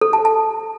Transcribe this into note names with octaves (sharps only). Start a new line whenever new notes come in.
A4
A5
A5